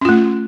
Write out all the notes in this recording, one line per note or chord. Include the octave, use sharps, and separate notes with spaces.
A3 C#4 F4